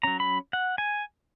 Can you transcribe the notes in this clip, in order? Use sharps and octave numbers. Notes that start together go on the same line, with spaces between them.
F#3 C#4 A#5
B5
F#5
G#5